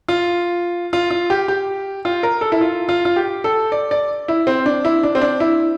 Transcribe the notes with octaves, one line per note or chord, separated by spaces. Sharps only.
F4
F4
F4
G4
G4
F4
A#4
A4
E4
F4
F4
F4
G4
A4
D5
D5
E4
C4
D4
E4
D4
C4
D4
E4